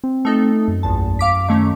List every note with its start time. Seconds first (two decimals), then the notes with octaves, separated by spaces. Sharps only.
0.04 C4
0.25 A3 D#4 A4
0.68 F#2
0.83 A#1 E2 A5
1.19 F5 D6 B6
1.48 D#3 A3 C#4